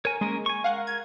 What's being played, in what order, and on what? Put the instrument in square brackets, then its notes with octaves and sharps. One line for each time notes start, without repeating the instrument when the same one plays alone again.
[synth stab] A#4 [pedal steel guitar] C#5 G#5
[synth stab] G#3 [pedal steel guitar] A#3 C#4 A#4
[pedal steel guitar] G#5 C#6
[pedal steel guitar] A#4 [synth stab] F5 F#5
[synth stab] G#6